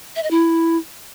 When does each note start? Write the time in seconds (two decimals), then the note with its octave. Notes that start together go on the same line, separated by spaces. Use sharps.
0.16 E5
0.23 D#5
0.31 E4